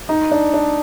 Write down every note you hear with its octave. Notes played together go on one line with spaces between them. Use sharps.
D#4
D4
D4